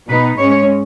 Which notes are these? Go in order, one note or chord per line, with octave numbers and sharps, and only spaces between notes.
B2 B3 D#4 B4
G#2 G#3 C#4 C#5